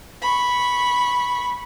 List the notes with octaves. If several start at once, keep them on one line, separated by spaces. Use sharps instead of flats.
B5 C#6